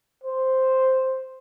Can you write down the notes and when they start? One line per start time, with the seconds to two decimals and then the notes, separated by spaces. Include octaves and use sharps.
0.24 C5